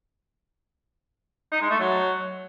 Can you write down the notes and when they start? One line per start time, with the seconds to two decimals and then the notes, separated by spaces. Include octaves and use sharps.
1.52 D#4
1.61 G#3
1.71 A3
1.80 F#3